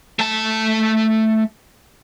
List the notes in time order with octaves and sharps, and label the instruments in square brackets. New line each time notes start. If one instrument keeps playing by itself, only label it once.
[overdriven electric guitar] A3 A5